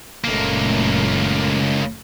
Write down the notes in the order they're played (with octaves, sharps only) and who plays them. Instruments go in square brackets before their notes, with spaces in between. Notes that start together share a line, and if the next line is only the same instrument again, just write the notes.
[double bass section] F#1 A#2 A3 [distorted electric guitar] C#2 A#3